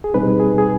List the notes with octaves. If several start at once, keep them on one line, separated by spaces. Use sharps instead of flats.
G#4
B2 G3 C4 D#4 B4
G#4
G#4